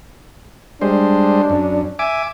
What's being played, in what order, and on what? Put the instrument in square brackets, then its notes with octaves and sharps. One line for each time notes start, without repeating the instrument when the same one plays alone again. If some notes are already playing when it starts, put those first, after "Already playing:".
[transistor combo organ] G3 G#3 C5 [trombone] D4
[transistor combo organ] F#2
E5 G#5 D6